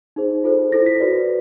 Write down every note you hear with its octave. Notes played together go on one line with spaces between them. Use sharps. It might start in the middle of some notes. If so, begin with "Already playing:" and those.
D#4 G#4 C5
F4 A4 C5
E4 A4 C5 A#6
B6
F#4 B4 D5